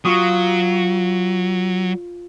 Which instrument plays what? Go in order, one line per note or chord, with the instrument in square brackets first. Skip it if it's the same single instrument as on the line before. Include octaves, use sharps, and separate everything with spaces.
[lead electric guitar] F#3 [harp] F4 C#6 D#6